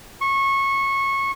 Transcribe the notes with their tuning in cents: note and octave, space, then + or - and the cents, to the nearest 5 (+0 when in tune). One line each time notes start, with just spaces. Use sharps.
C#6 -20